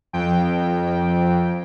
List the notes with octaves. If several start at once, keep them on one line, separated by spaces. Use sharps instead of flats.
F2 G5